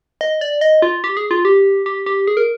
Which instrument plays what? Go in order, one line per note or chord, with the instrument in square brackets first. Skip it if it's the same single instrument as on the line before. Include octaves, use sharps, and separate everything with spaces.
[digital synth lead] D#5
D5
D#5
F4
G4
G#4
F4
G4
G4
G4
G#4
A#4